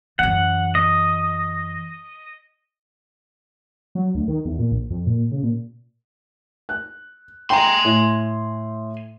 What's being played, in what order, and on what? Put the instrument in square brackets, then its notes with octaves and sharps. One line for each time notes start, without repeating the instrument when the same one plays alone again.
[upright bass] F#2 E3 [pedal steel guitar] F#5
[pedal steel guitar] D#5
[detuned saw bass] F#3
D2
D#3
E2
A#2
A#1
F2
A#2
C#3
A#2
[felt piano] F#6
[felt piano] G5 A#5 [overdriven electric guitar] G#5 C6
[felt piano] A2